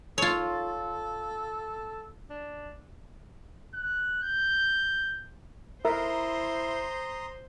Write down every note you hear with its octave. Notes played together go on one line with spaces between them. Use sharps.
F4 A4 C#5
D4
F#6
G6
E4 A#4 C5 E5 A#5 C6 D#6